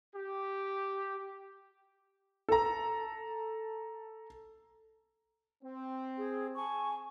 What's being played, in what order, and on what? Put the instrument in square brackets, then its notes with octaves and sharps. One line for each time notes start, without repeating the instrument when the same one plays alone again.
[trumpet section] G4
[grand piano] A4 A#5
[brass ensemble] C4
[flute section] G#4
G#5 A5 C#6